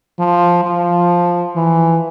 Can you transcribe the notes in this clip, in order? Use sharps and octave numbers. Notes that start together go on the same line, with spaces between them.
F3
F3
E3